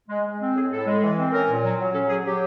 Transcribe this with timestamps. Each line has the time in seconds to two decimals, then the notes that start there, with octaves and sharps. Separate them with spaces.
0.09 G#3
0.25 G#3
0.41 C4
0.55 A2 G#4
0.71 A2 A4
0.87 G#3
1.02 E3
1.17 C4
1.32 C#4 A#4
1.48 A#2
1.63 F#3
1.79 F#3
1.94 C#4 A4
2.09 F#3 G#4
2.25 F#3 G4